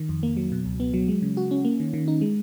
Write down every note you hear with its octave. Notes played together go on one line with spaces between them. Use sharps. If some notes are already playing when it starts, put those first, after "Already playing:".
Already playing: D#3
F2
A#3
F#3
B2
C#2
B3
F#3
G#3
C#3
F#4
C#4
A#3
D#3
D#3
D#4
G#3